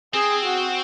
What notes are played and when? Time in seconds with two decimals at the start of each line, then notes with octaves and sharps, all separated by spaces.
0.14 C4 G#4
0.45 F#4